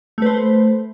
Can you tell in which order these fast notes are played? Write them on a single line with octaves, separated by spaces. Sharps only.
A3 B4 C5